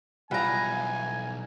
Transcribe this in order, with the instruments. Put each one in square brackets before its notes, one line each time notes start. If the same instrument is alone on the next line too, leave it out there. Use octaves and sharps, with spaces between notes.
[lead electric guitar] B1 F5 [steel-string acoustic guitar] E2 A#5 [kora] G3 F4 B4 [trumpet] G#5